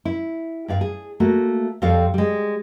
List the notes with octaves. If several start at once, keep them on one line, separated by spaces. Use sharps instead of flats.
E4
G2 D5 F5
G#4
A3 A#3 F#4
F2 G3 C4 A4 F5
G3 G#3